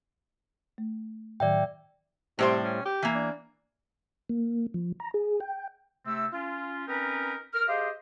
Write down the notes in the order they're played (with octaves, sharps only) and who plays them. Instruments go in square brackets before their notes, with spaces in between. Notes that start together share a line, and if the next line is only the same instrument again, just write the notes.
[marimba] A3
[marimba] A2 D#3 F#3 [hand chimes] D5 E5 G5
[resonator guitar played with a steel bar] A2 G3 C5 [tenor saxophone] C3
[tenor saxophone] C#4
G4
[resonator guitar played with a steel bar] E3 A#3
[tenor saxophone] D4
[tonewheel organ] A#3
F3
A#5
G#4
G5
[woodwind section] C3 A3 C4 E6
C#4 F4
C4 C#4 D#4 A#4 B4
A#4 F6
G4 G#4 C5 D#5 F5